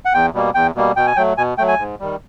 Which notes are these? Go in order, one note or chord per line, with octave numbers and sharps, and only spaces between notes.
F#5
E2 G5
B2 G3 A#3
E2 G5
B2 G3 A#3
B2 G5
G#5
F#3 A3 G5
B2 G#5
F#3 A3 G5
G#5
G#2
D#3 G3